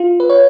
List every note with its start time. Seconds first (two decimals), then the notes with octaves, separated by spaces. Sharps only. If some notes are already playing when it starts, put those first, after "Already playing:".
Already playing: F4
0.20 B4
0.30 C#5